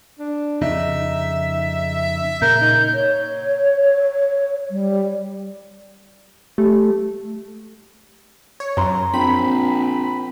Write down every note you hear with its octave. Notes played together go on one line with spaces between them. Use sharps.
D4
F2 C#3 D#4 E5
A#2 C#3 A#4 G6
D#4
C#5
G3
A3 G4
C#5
F#2 A#5 C6
A#1 C4 B5